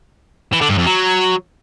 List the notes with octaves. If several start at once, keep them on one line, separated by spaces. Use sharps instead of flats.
E3
D3
G2
F2
F#3